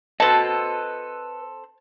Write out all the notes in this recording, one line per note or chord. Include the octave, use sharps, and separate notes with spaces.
C4 A4 B4 D#5 A5